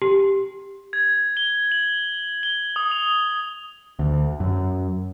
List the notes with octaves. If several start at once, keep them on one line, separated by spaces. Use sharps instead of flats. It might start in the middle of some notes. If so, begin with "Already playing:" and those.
G4
G#6
G7
F#7
G7
D#6
F7
D2
F#2